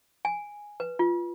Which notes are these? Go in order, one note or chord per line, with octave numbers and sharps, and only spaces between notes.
G#5
B4
F4